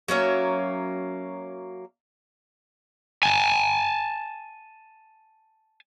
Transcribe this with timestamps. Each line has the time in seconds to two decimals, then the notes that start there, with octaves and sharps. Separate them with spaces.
0.08 F#3 A#3 C#4 E5
3.23 G#5 A5